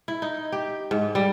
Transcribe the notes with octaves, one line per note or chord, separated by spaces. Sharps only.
E4
D#4
G4
G#2
G3